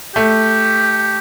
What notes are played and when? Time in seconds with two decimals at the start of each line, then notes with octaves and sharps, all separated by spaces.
0.15 A3 G4